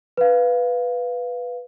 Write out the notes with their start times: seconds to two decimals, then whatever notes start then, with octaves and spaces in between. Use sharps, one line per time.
0.17 B4 F5